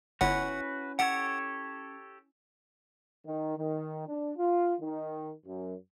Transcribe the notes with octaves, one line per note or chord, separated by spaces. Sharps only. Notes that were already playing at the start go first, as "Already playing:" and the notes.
G1 C#4 E4 F#4 B4 F#5
G4 A4 C#5 F#5
D#3
D#3
D4
F4
D#3
F#2